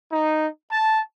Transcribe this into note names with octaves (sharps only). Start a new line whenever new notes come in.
D#4
A5